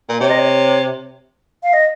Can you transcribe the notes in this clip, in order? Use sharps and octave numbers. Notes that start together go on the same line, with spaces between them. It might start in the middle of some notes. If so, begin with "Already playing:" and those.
A#2
C3 C#5
D#5
C#5
F5
D#5